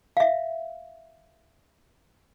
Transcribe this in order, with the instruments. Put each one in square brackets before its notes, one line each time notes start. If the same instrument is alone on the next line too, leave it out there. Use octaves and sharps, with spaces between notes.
[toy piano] E5 F5